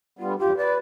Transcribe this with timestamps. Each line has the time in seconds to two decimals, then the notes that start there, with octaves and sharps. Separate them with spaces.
0.19 D3 G3 B3 F4
0.39 E2 G2 F4 G4
0.57 B4 D5